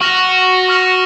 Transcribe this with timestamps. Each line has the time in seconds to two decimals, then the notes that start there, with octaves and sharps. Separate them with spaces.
0.01 F#4 C#6 F6 A#6 F7
0.68 C#6 F6 A#6 F7